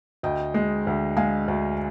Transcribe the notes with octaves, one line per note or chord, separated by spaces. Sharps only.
D2 D#5 G5
G#3
D2
G#3 F5 G#5
D2